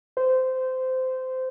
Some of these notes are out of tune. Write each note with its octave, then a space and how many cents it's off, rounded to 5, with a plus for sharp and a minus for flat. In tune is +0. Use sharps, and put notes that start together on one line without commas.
C5 -20